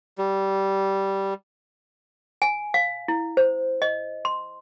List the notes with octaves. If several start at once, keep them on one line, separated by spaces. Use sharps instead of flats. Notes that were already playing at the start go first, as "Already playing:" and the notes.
G3
G#5
F5
E4
C5
D#5
C6